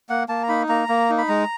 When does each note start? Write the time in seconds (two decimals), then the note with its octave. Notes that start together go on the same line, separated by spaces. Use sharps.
0.09 A#3 F#5
0.29 A#3 A5
0.43 A#5
0.49 D#4 B5
0.69 A#3 A#5
0.89 A#3
1.10 D#4
1.18 B5
1.28 G#3 A#5